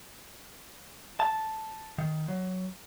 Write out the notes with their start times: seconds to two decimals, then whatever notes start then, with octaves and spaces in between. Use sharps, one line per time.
1.20 A5
1.98 D#3
2.28 F#3